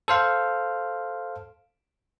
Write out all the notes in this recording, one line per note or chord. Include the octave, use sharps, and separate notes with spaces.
A4 C5 F5